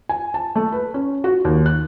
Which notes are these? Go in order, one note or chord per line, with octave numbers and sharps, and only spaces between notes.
G#5
A5
A3
B4
C#4
F#4
D#2
F#6